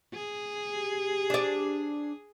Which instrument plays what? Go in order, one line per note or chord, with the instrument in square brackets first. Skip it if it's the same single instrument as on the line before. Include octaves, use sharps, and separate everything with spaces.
[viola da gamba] G#4
[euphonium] G4
[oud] D4 D5